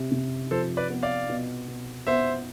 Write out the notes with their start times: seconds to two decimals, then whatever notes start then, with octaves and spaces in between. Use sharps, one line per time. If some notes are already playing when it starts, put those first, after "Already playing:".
Already playing: C3
0.12 C3
0.51 F3 A4 C5
0.77 B4 D5
0.90 B3
1.03 D5 F5
1.29 B2
1.68 B2
2.07 B3 C5 E5